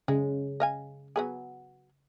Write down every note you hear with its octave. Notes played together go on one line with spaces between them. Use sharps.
C#3 G#3
D#5 F5 G#5
F#3 B3 G#4